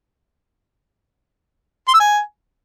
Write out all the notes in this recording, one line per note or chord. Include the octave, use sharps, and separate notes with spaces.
C6
E6
G#5